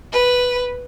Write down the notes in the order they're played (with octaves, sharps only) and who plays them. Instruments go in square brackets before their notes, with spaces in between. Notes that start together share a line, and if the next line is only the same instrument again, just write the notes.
[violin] B4